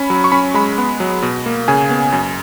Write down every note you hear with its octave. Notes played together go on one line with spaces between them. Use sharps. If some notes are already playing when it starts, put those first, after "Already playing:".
Already playing: C#4 B5
F#3
C#6
C#4 B5
G#3 B5
B3
F#3
B2
A#3
C#3 G#5
B3
F#2